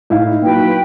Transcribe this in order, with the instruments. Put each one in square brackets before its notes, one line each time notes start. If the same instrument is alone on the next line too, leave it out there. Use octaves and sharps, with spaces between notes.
[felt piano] A2 [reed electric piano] D#4 E4 F5
[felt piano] A#2 F#3 [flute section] B4 G5